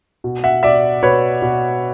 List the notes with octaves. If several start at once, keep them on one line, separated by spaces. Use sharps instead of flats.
B2
E5 F#5
B2 D5 E5
B2 B4 C#5
B2